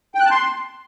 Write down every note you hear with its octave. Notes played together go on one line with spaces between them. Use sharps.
G5
F#6
A5
C6